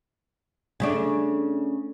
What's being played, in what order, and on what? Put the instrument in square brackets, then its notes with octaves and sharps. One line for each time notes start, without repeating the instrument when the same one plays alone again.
[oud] C#3 A3 D4